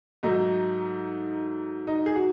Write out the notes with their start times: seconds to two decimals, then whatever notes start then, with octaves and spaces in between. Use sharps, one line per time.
0.23 G#2 F#3 A3 D#4
1.87 D#4
2.06 G#4
2.16 F#4